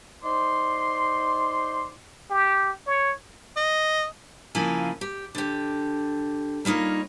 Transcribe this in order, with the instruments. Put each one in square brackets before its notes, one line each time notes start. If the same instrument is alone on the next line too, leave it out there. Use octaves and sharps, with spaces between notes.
[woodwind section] D#4 C5 D5 C6
[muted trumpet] G4
C#5
[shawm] D#5
[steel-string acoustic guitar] C#3 F3 A#3 E4 F5 G#5
G4
D3 G4
G3 A#3 D#4 F4 C#5